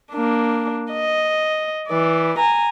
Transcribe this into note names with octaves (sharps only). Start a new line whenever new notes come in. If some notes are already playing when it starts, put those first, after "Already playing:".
A#3 D4
D#5
E3 D5
G#5 A#5